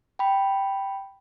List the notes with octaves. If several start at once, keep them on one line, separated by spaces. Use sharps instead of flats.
G5 B5